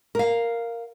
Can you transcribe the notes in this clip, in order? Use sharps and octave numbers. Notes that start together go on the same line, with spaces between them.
A#4 F5